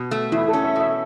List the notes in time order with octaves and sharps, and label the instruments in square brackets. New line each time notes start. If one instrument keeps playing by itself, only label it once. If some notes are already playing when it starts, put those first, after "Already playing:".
Already playing: [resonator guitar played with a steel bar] B2
A3
[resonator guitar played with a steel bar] E2 [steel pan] E4
[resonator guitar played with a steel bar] C#4 [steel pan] A4
[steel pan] E5
[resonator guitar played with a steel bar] B2 [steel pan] E5